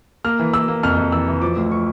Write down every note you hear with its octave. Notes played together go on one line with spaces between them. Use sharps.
A#3 F6
E3
A#3 E6
A#3
F2 F6
F2
E3 E6
E3
F3 D6
D2
F3 C#6